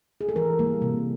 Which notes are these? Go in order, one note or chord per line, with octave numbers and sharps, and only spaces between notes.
G#4
A4
E3 A#4
G3 A#3
C3